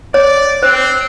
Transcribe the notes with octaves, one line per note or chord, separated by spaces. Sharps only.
C#5 D5
C4 C5